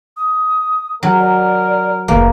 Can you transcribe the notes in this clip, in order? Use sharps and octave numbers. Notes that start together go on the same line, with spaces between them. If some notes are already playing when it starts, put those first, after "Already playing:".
D#6
F#3 A#4
D5
F1 A#1 A#3 B4